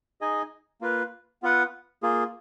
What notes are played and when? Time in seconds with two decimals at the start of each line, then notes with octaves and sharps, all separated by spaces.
0.21 D#4 G#4 D#5 G#5
0.81 A#3 F4 B4
1.42 B3 F4 B4 F#5
2.03 A#3 F4 G#4